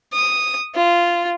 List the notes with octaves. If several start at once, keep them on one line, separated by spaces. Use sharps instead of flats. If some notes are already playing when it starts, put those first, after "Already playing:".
D#6
F4